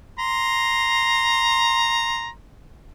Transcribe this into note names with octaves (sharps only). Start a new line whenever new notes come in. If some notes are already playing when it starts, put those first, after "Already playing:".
A#5 C6